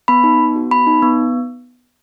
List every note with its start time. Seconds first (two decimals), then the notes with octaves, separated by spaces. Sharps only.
0.08 B3 B5
0.24 D#4
0.40 B3
0.56 F#4
0.71 B3 B5
0.87 D#4
1.02 B3